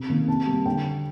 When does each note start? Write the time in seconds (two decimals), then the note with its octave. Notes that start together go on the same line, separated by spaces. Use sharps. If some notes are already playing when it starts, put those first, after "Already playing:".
Already playing: C3
0.09 D#3 A#3
0.28 C3 A5
0.47 G3 A#3
0.66 D3 G5